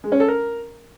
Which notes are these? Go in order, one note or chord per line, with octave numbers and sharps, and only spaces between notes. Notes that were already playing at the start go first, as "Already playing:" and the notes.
G#3
C#4
A4
A#4